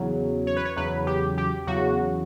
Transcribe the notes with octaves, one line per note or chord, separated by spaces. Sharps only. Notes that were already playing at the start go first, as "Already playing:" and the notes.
Already playing: E2 C#3 F#3
C#5
B4
C#5
E2 C#3 F#3 B4
G4
G4
E2 C#3 F#3 F#4